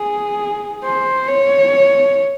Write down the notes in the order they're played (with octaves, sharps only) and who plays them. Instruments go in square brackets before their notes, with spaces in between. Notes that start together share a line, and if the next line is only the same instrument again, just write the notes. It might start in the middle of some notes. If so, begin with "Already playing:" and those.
Already playing: [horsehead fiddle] G#4
C5
C#5